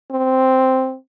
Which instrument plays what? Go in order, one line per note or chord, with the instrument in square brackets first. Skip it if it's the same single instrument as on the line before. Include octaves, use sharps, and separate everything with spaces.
[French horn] C4